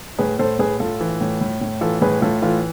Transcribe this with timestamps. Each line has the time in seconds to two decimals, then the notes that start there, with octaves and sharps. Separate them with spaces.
0.19 A2 G#4 B4
0.39 A2 A4 C5
0.59 A2 G#4 B4
0.80 A2 F4 A4
1.01 E3
1.21 A2
1.41 A2
1.61 A2
1.81 E3 F4 A4
2.01 A2 G#4 B4
2.22 A2 F4 A4
2.42 E3 F4 A4